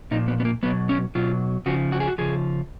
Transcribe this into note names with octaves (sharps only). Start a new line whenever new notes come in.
A#2 F3 D#4
B3
B3
A#3
B2 F#3 B3
C#4
B2 F#3 F4
C#3 F3 F#4
F#4
G#4
F#4
C#3 F3 G#4